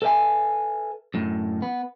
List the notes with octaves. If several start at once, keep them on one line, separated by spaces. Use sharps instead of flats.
A4 B4 D5 E5 G#5
F#2 A2
B3